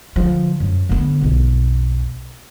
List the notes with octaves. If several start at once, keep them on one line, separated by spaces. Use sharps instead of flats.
D3 F3
F#2
D3 B3
B1 F2